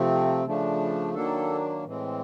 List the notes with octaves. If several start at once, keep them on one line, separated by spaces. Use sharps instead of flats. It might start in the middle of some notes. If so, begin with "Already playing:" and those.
Already playing: C3 F3 A3 C4
C#3 F3 A3 D4
D#3 F#3 A#3 D4 A4
A2 E3 G#3 C4